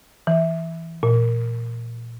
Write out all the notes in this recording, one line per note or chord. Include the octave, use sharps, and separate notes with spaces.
E3
A#2